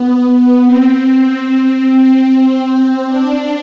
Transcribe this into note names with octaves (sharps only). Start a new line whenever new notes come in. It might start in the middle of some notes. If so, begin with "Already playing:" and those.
Already playing: B3
B3
C4
C4
C4
D4